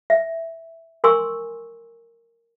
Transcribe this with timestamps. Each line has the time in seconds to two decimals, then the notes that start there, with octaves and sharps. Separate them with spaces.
0.10 E5
1.04 A#4 G#5 C6 C#6 E6